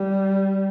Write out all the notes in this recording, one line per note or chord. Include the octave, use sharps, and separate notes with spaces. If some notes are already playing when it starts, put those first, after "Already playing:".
Already playing: G3